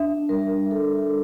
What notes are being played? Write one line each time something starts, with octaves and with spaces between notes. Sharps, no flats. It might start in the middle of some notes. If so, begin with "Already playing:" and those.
Already playing: D4 E5
G3 A#4
G3 A4